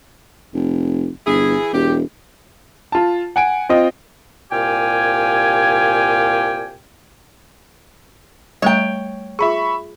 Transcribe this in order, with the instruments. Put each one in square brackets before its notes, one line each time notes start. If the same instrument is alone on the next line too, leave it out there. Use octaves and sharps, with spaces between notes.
[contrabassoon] F1
[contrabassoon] G1 [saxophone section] E3 E4 G#4
[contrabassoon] E1 [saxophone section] G4
[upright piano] F4 A5
F#5 G#5 D7
C4 F4 D#5
[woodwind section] C2 A#2 G4 F5 G5 G#5
[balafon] G3 A3 A#5 [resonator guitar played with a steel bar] C#5 G5
[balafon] F4 G#4 [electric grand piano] E5 B5 C#6